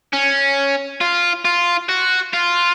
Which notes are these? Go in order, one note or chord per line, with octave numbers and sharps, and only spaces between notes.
C#4
F4
F4
F#4
F4